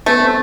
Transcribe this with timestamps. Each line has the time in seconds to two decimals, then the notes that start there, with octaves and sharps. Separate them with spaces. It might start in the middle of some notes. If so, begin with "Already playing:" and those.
0.06 A3 B3
0.22 C4